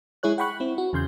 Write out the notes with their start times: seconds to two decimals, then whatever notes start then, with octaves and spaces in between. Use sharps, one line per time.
0.23 G#3 E4 G#4 C#5 F#6
0.38 F#5 G5 B5 C#6 F#6
0.60 C4 E4
0.78 F#4
0.93 E2 C#3 C6 G6